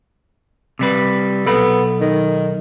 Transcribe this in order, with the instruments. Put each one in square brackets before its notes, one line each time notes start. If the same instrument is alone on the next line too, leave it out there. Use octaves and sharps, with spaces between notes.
[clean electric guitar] C3 G3 B4
[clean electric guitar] B1 A4 B5 [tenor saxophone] B3
[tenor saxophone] D#3